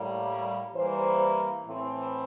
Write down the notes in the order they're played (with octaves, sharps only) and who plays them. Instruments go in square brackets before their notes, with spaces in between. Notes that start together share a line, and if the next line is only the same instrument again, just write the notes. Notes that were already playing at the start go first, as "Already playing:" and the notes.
Already playing: [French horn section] A2 G3 A#3
[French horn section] E3 G3 A#3 [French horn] C5
[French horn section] A2 E3 A3 C4